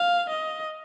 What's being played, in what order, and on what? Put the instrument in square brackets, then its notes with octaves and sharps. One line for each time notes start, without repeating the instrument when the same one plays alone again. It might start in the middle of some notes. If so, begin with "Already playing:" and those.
Already playing: [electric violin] F5
D#5